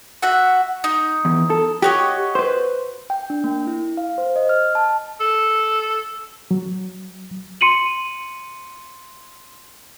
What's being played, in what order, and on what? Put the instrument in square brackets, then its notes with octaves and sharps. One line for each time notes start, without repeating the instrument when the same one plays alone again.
[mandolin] F#4 E5 F#5
D#4
[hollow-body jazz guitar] E2
A4
[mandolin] F#4 C#5 D#5 [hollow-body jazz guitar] G4
[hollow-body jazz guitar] B4 C5
[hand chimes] G5
D4
A#3
E4
F5
C5
D#5
F6
A5
[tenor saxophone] A4
[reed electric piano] F#3
[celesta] C6 C#7 D#7 F#7